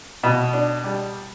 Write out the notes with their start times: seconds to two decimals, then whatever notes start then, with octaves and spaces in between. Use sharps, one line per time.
0.23 B2
0.53 D4
0.84 G3